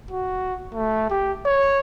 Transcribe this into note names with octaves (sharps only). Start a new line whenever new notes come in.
F#4
A3
G4
C#5